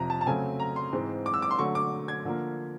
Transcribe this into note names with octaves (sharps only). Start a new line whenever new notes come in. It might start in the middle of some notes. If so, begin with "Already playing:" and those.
Already playing: F2 C3 F3 A#5
A5
A5
C#3 F#3 A3 C4 G#5
A#5
C6
G#2 E3 G#3 C4
D6
E6
D6
C6
D3 F#3 A3 C#6
D6
G#6
D3 F3 A#3